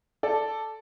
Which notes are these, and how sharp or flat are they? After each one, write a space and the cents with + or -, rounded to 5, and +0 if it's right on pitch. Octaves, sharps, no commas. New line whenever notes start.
A4 +0 D5 +0